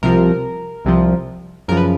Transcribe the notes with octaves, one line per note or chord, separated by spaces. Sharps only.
C2 C3 F3 A#4
C2 C3 F3
F#2 C#3 F3 A#4
B4